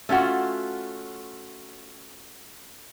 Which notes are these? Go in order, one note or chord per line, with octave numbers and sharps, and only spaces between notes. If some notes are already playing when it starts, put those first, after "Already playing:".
A3 C#4 F4 F#4